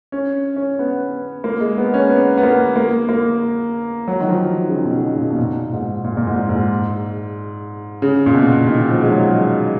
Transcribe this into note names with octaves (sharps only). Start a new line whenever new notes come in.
C#4
C#4
B3
A#3
G#3
B3
C#4
B3
B3
A#3
A#3
A#3
F#3
D#3
F3
C#3
D#3
B2
C#3
A#2
B2
A#2
G#2
A#2
A#2
G#2
G#2
C#3
A#2
B2
D#3
F3
G#3
F#3